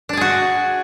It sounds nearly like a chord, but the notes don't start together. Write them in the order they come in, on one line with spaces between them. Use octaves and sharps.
D4 D5 G#4 F#4